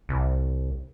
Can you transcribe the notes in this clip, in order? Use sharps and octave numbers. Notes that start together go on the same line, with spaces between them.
C2